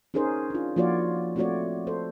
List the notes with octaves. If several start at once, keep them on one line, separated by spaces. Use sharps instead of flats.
C#4 D#4 G#4 A#4 C5
D4 F4
F3 A#3 F4 F#4 C#5 D5
A3 C4 F4 F#4 C#5 D5
A4 C5